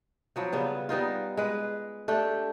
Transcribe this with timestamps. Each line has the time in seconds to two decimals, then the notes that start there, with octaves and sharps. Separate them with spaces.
0.36 F3 F#3 B3
0.52 C#3 G3 B3 B4
0.89 G3 B3 D#4 F4
1.37 G#3 B4
2.08 A3 D4 G4 A4